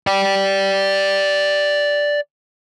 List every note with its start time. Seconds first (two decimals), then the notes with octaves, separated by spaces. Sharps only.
0.07 D5 G5